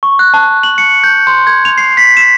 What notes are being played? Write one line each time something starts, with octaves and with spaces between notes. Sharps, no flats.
C#6
F#6
A5
F#7
C#7
G6
C6
G#6
F7
C7
B6
E7